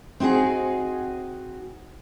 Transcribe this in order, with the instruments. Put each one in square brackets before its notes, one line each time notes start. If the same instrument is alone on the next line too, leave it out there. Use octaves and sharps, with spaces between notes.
[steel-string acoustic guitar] C4 D#4 F#4 G#4